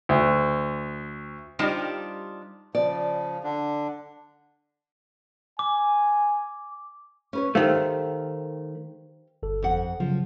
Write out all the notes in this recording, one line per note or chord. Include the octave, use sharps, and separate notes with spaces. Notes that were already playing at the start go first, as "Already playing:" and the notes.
D2
G3 D4 D#4 F4 G4 C5
C#3 F3 D5
D3 D4
G#5 D6
C#4 B4 C#5
D#3 A3 G4 C5 F5
G1 A4
F2 F#5
C#3 F3 F#3